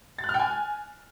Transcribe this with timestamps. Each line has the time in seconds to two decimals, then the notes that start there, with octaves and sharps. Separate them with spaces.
0.18 A6
0.24 F#6
0.29 F6
0.34 G5
0.39 G#5